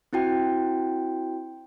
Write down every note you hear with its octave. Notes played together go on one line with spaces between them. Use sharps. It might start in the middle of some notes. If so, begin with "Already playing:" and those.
C4 E4 F#4 G5